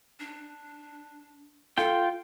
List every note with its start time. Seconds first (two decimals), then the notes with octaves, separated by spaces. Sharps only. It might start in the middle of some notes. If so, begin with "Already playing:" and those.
0.20 D4
1.78 F4 A4 G5